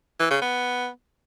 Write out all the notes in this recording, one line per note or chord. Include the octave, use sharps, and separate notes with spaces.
E3
C#3
B3